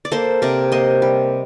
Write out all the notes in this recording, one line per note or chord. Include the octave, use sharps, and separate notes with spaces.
D5
A#3 A4 C5
C3 A#4 D5
A#3 C5 D#5
G3